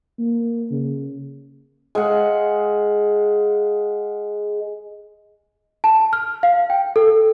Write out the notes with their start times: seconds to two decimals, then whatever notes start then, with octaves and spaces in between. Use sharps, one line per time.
0.19 A#3
0.71 C#3
1.95 G#3 F5 F#5
5.84 A5
6.13 F6
6.43 F5
6.70 G5
6.96 A4